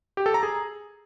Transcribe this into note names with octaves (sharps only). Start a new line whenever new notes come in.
G4
A4
A#5
G#4